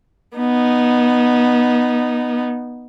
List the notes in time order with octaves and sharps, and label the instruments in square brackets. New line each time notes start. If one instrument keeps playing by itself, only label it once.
[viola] B3 D#4